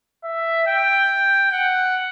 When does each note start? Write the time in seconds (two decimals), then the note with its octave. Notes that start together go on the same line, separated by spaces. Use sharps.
0.24 E5
0.67 G5
1.52 F#5